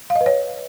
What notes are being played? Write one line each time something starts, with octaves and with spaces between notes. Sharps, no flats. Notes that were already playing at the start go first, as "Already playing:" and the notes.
F5
D#5
B4
C#5